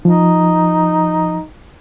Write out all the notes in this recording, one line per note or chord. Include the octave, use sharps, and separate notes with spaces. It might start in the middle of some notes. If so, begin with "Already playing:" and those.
F3 D#4